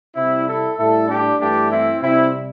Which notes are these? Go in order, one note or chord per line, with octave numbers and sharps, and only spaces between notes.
C3 G3 C4 E4
E4 A4
A2 G3 E4 A4
D4 G4
G2 E3 A3 D4 G4
C4 E4
C3 G3 C4 E4